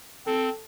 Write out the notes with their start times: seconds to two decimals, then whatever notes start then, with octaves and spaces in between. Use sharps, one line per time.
0.26 C4 A4